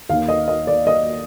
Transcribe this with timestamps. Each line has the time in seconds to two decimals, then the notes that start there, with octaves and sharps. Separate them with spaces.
0.09 D#2 D#3 F5
0.28 D#5
0.48 D#5
0.67 D5
0.87 D#5